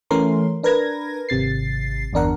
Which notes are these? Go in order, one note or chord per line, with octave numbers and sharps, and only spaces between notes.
E3 A3 C#4 A#4 C6
D4 A#4 B4 G#6 A#6
G#1 C3 A6 C7
G1 E2 D4 A#4 F#5